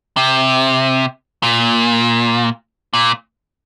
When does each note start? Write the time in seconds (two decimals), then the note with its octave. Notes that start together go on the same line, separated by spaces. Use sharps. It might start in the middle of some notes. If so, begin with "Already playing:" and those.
0.17 C3
1.43 A#2
2.94 A#2